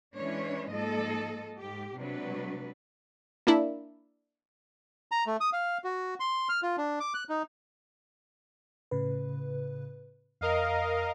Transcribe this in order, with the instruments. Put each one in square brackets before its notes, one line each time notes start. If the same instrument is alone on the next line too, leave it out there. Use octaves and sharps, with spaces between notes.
[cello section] E3 G#3 C#4 D4 B4 C#5
G#2 F3 G#3 A#3 A4 D#5
G#2 G4
C3 F#3 G#3 D4 B4
[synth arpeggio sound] A#3 D4 E4
[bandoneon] A#5
A3
D#6
F5
F#4
C6
F6
F4
D4
D6
F#6
D#4
[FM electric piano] A2 C#3 B4
[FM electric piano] F2 [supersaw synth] A#4 D#5 F5